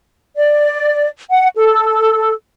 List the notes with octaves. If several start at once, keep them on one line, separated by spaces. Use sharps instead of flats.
D5
F#5
A4